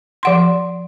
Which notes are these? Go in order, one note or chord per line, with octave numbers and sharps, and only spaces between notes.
F3 F#5 C6